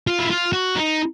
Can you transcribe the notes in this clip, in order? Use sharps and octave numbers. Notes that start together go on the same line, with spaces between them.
F4
E4
F4
F#4
D#4